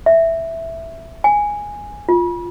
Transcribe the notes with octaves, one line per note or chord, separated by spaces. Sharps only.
E5
G#5
F4